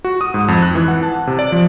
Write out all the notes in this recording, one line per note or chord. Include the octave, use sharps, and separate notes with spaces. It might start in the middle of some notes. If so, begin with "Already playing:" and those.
F#4
D#6
G#2
F2
F#6
E3
F#5
A5
C3
D5
F3